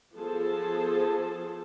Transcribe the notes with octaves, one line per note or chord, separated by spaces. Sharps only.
F3 B3 G#4 A4 C5 A5